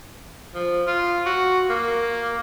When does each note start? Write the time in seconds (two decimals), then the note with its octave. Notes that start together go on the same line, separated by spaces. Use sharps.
0.55 F3
0.87 F4
1.26 F#4
1.70 A#3